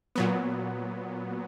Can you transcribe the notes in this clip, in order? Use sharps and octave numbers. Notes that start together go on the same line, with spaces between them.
A#2 F#3 B3